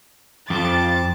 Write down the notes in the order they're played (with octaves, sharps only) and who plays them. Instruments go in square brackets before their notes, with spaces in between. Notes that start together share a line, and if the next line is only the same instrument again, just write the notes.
[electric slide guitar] F2 [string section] A5 D6 A6